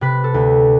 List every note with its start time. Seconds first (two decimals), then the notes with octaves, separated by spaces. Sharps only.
0.01 C3 B4
0.24 A4
0.34 D2